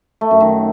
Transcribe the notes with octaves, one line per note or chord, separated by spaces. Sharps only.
A3
F#2
D#3